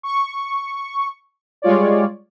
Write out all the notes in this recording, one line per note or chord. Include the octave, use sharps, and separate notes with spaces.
C#6
G3 G#3 F4 C#5 D5